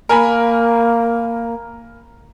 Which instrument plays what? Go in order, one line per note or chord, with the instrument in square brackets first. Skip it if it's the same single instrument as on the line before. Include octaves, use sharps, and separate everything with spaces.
[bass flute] A#3 [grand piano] A#4 G#5 B5